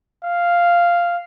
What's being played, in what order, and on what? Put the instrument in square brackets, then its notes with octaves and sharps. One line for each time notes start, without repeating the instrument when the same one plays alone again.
[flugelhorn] F5